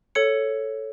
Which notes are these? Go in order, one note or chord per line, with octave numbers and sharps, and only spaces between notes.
A4 C#5 C#7